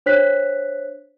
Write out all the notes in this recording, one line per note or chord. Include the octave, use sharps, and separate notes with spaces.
D4 C5 C#5 F#6 B6